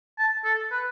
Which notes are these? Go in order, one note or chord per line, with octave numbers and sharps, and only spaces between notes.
A5
A4
B4